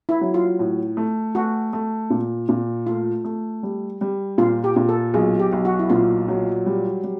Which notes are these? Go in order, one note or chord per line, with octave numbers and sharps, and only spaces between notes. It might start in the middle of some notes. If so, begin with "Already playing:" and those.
E4
F#3
F4
A2
A3
A3 F#4
A3
A#2
A#2
A3 F4
A3
G3
G3
A#2 F4
G4
A#2
A4
B1 G#4
G4
B1
F#4
E4
A#2 F4
F#3
G3
G3